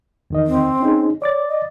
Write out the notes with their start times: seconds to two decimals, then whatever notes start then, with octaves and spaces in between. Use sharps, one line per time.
0.30 E2 D#3 D#5
0.47 C4
0.80 C#4 D#4 G#4
1.22 C#5 D5 D6 A6
1.48 D#5